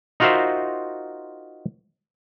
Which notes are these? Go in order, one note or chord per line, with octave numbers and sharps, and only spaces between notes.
D#4 F4 F#4 A#4 C5 E5